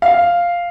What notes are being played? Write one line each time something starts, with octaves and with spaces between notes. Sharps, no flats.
F5